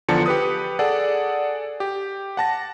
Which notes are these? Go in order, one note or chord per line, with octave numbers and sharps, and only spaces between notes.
E2 D3 F3 D4 A5 C#7
G4 B4 D#6
G#4 A4 D5 F#5
G4
F#5 A5 A#6